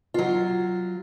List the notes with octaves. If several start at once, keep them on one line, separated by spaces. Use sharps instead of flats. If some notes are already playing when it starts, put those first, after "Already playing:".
F#3 F4